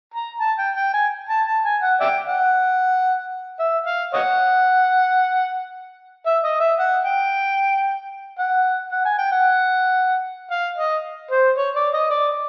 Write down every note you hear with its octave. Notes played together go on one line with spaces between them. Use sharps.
A#5
A5
G5
G5
G#5
A5
A5
G#5
F#5
D5 E5 G5
F#5
E5
F5
C#5 D#5 F#5
E5
D#5
E5
F#5
G5
F#5
F#5
G#5
G5
F#5
F5
D#5
C5
C#5
D5
D#5
D5